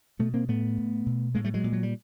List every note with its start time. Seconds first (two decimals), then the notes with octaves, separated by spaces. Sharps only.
0.19 B2 A3 B3
0.34 A#3 C4
0.48 A2 A3 B3
0.78 A2
1.06 B2
1.35 A2 G#3 A#3
1.44 G3 A3
1.54 F#3 G#3
1.64 A#2
1.73 F#3
1.83 G3